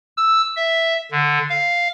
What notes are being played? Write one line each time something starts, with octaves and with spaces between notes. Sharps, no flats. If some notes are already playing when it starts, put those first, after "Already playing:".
E6
E5
D3
F5